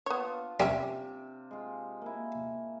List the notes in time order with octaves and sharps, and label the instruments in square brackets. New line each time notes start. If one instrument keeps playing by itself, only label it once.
[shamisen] B3 C#5 [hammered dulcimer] D4 F4
[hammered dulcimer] C3 [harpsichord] G3 [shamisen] C#4 E5 G#5
[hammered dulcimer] G#3 F4
A#3 E4